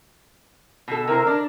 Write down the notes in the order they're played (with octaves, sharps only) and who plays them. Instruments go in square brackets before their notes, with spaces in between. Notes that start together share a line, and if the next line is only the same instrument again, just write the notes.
[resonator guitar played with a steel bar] B2 A4
[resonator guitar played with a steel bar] C3 E4 C5 [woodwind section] A#4
[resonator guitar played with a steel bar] D4